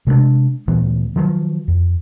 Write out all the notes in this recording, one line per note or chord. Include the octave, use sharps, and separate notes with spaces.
C3 G#3 B3 D4
D2 A#2 E3 B3
D#3 F3 F#3
F2